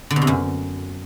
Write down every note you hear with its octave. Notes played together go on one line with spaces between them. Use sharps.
D3
B2
C3
F#2